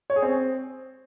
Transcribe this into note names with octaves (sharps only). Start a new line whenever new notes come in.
C#5
G#4
C4